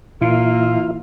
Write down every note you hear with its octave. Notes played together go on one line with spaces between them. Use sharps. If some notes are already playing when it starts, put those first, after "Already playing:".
A#2 E3 A#3 E4 F4